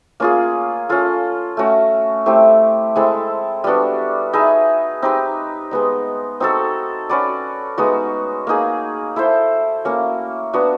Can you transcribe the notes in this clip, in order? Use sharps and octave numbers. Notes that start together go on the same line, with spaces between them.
A#3 C#4 F4 G#4
C#4 F4 A4
A3 C#4 F#4
A3 C4 E4 G4
G#3 C4 E4 A4
G3 B3 D4 F#4
D#4 G#4 B4 E5
C4 D#4 G4 B4
G#3 B3 D#4
C4 D#4 F#4 A4
C#4 F#4 B4 D5
G#3 B3 D#4 F#4
A#3 D#4 G#4
E4 A4 C5
A#3 C#4 F#4
B3 D4 F#4